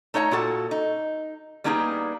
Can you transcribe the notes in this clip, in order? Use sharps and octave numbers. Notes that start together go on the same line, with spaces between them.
A3 D#4 C#5 F5 A#5
A#2 F#4 A4 F#5
D#4
G3 A#3 B3 D#4 E4 G#4